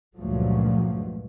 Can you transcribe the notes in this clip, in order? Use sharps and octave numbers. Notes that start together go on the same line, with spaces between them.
C#2 G2 A#2 F3 F#3 A3